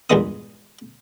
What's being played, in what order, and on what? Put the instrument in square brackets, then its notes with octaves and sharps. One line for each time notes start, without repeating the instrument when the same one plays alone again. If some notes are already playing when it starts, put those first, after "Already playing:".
[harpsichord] A#1 E2 G2 G#3 B3 D#6